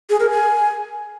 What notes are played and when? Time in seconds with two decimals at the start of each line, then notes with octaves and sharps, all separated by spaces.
0.10 G#4
0.20 A#4
0.30 G#5